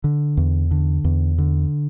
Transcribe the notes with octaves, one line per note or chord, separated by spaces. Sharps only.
D3
E2
D3
E2
D3